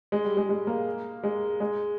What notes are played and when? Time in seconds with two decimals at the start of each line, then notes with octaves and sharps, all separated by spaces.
0.12 G#3
0.25 G3
0.37 G#3
0.49 G#3
0.67 A#3
1.23 G#3
1.60 G#3